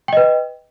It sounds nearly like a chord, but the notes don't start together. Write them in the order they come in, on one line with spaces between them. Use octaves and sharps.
G5 D#5 B4